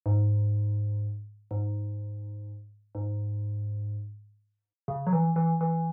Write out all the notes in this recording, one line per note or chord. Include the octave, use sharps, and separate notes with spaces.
G#2
G#2
G#2
C#3
F#3
E3
E3
E3